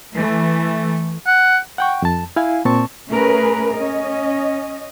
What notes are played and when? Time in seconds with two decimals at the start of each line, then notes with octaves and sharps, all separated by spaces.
0.15 E3 A3
1.27 F#5
1.78 F#5 G5 C#6
2.02 F2 A5
2.36 E4 F5 G#5
2.65 A#2 C4 A5 C#6
3.10 A3 C#4 G#4 A#4 B4
3.73 C#4 D#5